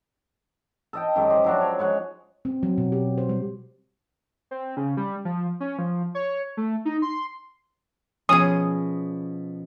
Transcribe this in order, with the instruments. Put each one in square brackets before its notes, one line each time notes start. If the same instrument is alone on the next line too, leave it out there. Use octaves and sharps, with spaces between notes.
[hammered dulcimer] A4 D#5 G5
F#2 D#3 G#3 G4
G4 C5 D5
F3 F#3 D4
C#5
G#3 C#5 F#5
[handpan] C4
F#3
B2
G4
C5
G3
[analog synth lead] C4
C#3
G3
F3
C#4
F3
C#5
A3
D#4
C6
[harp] B2 F3 [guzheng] C#4 G#4 [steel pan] D#6